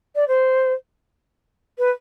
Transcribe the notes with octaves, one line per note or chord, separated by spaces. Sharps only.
D5
C5
B4